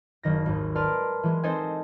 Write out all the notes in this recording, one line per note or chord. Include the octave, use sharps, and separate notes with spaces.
F#1 D#3 A#6
G#1 D#2
A#4 B4 D5 A5 C6 F6
E3 G#3
C4 D#4 A4 C5 D#5 G#5